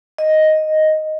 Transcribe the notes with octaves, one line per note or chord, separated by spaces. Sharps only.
D#5